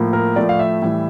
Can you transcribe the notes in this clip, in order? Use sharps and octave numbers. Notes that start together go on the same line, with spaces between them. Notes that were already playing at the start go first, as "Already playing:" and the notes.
Already playing: A2 F3 A#3
A#4
A2 F3 A3 D5
F5
E5
A2 E3 G3